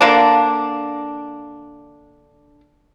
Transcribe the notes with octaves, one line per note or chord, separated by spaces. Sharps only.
D3 A#3 D4